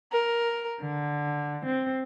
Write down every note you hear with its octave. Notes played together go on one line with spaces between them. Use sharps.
A#4
D3
C4